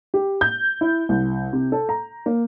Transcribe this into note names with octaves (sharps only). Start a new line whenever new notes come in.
G4
G6
E4
C2
C3
A4
A#5
A#3